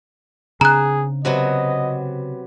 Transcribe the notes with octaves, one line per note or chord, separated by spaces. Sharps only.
C#3 C4 D4 G#4 A#5 F#6
C3 F#3 B3 D#5